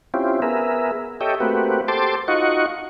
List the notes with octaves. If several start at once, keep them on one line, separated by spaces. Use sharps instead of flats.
C4 C#4 E4 F4 G4
B3 G#4 A#4 E5
G4 A4 C#5 D#5 E5 G5
A3 A#3 C4 F#4 G4 B4
G4 A4 C5 A5 C6 D6
D#4 F4 F#4 D#5 F#5 C#6